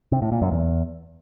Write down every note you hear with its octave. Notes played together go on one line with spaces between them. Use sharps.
C3
A2
A#2
F#2
E2